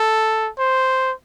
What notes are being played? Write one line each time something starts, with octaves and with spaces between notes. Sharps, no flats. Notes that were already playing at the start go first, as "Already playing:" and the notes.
Already playing: A4
C5